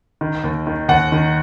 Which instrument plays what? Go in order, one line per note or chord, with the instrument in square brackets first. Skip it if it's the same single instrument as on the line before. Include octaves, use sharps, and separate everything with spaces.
[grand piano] D#3
D#2
D#3
D#2 F#5
D#3